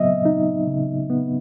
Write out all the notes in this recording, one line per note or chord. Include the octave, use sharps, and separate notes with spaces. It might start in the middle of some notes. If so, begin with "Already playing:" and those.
Already playing: C#3 F#3 B3 D#5 E5
D#4
C#3
B3